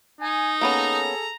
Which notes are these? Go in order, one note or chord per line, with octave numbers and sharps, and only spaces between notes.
D#4 G#5
A#3 B3 C#4 G#4 A4 A#5